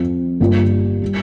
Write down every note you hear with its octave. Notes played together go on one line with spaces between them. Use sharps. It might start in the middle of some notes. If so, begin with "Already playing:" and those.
Already playing: F2 F3 C4
G1 G2 G3 A#3 F4
G3